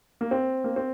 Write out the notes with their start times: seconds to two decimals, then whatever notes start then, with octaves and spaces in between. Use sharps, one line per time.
0.21 A#3
0.31 C4
0.64 A#3
0.76 C4